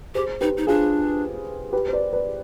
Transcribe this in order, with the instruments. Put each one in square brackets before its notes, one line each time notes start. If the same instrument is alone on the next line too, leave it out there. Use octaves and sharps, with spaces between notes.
[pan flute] G4 [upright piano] G#4 C5
[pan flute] D#4 [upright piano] G4 B4
[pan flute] D#4
[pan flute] D4 [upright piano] F4 G#4
[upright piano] G4 B4
C5
B4 D5
B4 D5